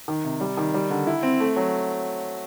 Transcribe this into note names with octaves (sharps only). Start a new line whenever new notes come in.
D#3
C3
G3
D#3
G3
D3
E4
C4
A3
F#3